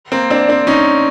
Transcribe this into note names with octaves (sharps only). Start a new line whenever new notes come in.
A#3 C4
C4 D4
C4 D4
C#4 D#4